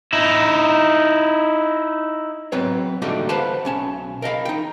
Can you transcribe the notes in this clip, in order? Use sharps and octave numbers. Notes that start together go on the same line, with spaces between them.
D#4 E4
F#3 B3 C4 B4 C#5
D3 G3 A3 A#3 D#4 F#4
B4 C5 F5 F#5 A5 B5
B1 C#4 A5
A#4 D#5 F5 B5
D#4 G5